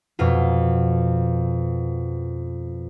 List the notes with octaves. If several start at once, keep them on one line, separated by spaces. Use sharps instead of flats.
F2 B2 F4